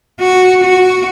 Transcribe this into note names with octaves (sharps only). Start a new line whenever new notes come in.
F#4
F#4